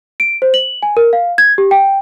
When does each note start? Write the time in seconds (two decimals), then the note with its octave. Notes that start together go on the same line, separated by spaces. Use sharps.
0.20 D7
0.42 C5
0.54 F#7
0.83 G#5
0.97 A#4
1.13 F5
1.38 G#6
1.58 G4
1.71 G5